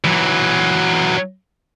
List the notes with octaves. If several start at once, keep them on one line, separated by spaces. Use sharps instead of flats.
E3 F#3